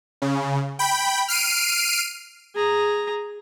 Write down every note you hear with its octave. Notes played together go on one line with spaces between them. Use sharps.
C#3
G5 B5
F6 C7 D7 D#7
G#4 A#5